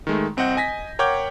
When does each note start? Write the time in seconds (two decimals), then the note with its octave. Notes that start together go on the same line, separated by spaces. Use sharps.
0.07 D#3 G#3 A3
0.37 C2 C4 D#5 F#5 G6
0.56 D#5 G#5 A#6 B6
0.99 A#4 C#5 F#5 G5 D6 G6